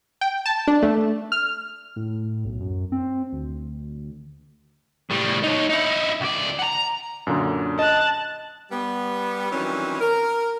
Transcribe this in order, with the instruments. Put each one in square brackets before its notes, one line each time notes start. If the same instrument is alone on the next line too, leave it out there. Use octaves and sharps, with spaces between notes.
[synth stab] G5
A5
D4
A3
F6
[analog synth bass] A2
B1
F#2
C4
D2
[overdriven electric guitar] A2 G3
D#4 C#5
D#4 E4
C#2 D5
F#5 A#5
[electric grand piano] F#2 A#2 D3
[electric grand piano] D#5 [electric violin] A5 F#6
[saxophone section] G3 B3
D#3 E3 F#3 G3 C4 C#4
A#4